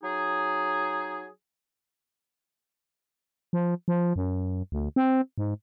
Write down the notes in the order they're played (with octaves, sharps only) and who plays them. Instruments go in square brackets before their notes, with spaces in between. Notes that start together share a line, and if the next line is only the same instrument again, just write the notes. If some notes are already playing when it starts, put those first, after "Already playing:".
[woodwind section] F#3 D#4 G#4
[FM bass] F3
F3
F#2
D2
C4
G#2